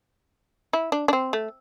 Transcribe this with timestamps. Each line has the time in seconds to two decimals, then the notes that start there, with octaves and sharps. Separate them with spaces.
0.73 E4
0.92 D4
1.08 D4
1.13 C4
1.33 A3